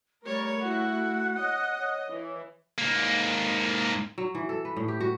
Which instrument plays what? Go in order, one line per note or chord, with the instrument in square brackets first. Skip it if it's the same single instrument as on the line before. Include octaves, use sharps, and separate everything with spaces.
[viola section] G3 A#4 C#5 [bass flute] A3
[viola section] E4 F#4 [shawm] F#5
[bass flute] C#5 [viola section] D#5
[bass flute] C#5
[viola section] E3
[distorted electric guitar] G#2 A#3
[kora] F#3
E3
A4
B4
A2
G4
F#4